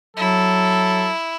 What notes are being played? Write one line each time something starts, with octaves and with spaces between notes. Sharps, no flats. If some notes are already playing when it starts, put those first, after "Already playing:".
F#3 E4 A4